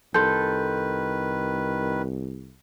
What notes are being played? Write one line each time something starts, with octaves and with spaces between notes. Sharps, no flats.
C2 D#3 A4 B4 C6 G6